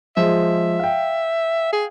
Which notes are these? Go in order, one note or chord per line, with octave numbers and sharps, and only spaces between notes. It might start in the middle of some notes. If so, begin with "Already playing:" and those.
F3 G#3 E5
F5 G5
G#4